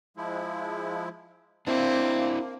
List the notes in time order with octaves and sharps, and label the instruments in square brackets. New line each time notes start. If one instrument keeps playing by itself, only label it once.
[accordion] F3 G#3 E4
[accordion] A#3 [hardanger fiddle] C4 [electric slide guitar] D4 E4